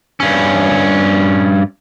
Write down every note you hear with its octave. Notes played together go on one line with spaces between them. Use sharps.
G2 C#4